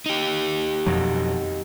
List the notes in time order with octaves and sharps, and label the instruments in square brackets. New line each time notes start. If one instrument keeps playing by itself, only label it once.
[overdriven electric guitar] D#4 G4
[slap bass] F2 B2 F#3